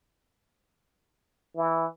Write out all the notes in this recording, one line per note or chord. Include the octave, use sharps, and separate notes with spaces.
E3